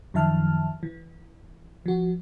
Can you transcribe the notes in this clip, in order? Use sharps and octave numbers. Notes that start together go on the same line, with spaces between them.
F#2 D#3 F3 E5 A5 F6
E3
F3 F#4